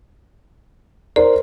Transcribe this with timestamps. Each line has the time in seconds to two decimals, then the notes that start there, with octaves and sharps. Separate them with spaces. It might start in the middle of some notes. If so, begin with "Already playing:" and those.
1.16 A#4 C5 D5